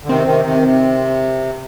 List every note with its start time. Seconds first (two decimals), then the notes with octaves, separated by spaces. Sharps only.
0.04 D3
0.08 C3 D#3 C4
0.27 C3 D#3
0.45 C3 D#3
0.63 C3